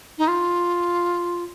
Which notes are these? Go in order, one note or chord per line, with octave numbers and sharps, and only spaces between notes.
D#4
F4